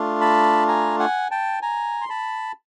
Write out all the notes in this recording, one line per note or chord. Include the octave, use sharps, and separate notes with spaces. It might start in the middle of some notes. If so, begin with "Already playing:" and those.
Already playing: A3 D4 F4
A5 B5
G#5 A#5
F#5 G#5
G5 A5
G#5 A#5
C6
A5 B5